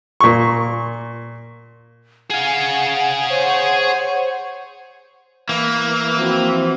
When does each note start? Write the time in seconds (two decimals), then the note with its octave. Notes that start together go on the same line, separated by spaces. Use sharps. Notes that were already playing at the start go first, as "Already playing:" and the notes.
0.21 A#2 C#6
2.31 G#4 F5 F#5 G#5
3.30 C5 C#5
5.49 E3 A#3
6.17 F3 C4 F#4